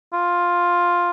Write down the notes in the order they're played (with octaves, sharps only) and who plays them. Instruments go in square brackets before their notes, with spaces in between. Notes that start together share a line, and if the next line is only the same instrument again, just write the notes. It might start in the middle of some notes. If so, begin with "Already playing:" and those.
[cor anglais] F4